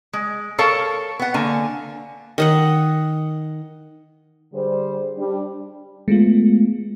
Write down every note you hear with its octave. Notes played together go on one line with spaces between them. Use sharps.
G#3
A4 A#4 C#5 F5 A5
B3 F#5
D3 A#3 G#5
D#3 D#5 F#5
D3 G3 G#4 C5
G3 D4
G#3 A3 B3 F4